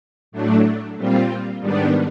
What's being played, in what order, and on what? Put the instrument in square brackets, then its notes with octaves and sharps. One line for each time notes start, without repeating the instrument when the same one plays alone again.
[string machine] A2 F#3 A3 D4
A#2 G3 C4 F4
G#2 D#3 G3 B3 D4